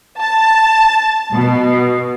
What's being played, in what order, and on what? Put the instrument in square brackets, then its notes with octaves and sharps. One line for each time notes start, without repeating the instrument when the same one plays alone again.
[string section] A5
B2